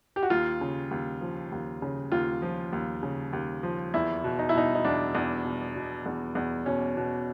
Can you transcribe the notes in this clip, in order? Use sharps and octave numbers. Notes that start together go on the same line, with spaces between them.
G4
F#4
D#2 F4
C#3
D#2
F3
D#2
C#3
D#2 F4
F3
D#2
C#3
D#2
F3
E2 E4
B2
D#4
E4
B2 D#4
D#4
E2 D4
E2
B2
B2
E2
E2
B2 C#4
B2